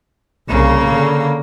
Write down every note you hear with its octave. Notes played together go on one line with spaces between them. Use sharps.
C2 C#3 A#3
D3